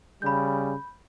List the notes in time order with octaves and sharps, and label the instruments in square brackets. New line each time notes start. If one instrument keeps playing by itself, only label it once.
[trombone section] C#3 G3 [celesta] B5 G6